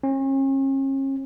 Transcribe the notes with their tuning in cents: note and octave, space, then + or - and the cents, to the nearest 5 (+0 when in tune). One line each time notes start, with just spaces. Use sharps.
C#4 -40